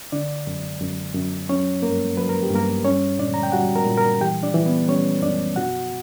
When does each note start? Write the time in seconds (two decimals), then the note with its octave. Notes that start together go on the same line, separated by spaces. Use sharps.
0.12 D3 D4 D5
0.47 F#2
0.80 F#2
1.15 F#2
1.49 F#3 C#4 C#5
1.82 G2 A#3 A#4
2.17 F#3 B4
2.29 A#4
2.43 G4
2.50 G2 A#3 A#4
2.85 G3 C#4 C#5
3.19 A#2 D4 D5
3.34 A#5
3.43 G5
3.52 G3 F#4 F#5
3.76 A#4 A#5
3.86 A#2
3.97 A#4 A#5
4.21 E3 G4 G5
4.43 D4 D5
4.54 E3
4.66 B3 B4
4.88 G3 C#4 C#5
5.22 F#2 D4 D5
5.56 B2 F#4 F#5